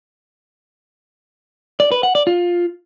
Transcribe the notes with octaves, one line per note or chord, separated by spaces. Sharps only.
D5
B4
F#5
D5
F4